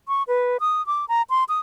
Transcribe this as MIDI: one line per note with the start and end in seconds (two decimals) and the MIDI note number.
0.08 0.23 85
0.28 0.57 71
0.60 0.85 87
0.87 1.05 86
1.09 1.22 82
1.30 1.44 84
1.49 1.60 87